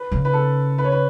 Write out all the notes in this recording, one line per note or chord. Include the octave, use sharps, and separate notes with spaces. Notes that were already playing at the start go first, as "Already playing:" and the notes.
Already playing: B4
C#3
B4
A4
B4
C#5
B4